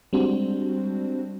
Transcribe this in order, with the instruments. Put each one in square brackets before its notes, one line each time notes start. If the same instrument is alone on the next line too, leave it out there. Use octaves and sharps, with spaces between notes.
[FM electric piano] G3 G#3 C4 D4 F#4 C5